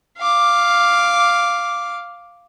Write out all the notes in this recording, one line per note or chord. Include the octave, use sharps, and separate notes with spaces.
F5 D6